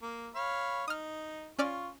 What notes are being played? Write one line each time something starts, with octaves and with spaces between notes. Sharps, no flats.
A#3
C#5 F5 B5
D#4 D#6 F6
C#4 F4 D5 C#6 F6